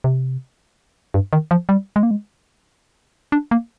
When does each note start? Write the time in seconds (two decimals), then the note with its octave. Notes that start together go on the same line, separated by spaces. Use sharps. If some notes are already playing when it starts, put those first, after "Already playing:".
0.04 C3
1.14 G2
1.33 D#3
1.51 F3
1.69 G3
1.96 G#3
2.03 A#3
2.11 G#3
3.32 D4
3.51 A#3